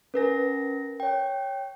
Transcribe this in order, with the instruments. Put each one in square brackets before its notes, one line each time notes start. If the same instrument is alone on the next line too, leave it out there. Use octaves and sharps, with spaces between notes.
[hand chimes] C#4 A#4 A#6 [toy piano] B4 G#5
[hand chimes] C#5 G5